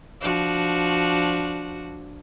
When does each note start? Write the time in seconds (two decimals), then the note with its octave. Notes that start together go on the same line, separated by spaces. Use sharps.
0.22 F3 D4 F#4